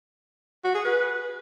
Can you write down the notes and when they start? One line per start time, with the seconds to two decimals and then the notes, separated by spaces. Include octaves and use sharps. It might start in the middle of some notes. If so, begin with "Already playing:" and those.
0.64 F#4
0.75 G#4
0.85 B4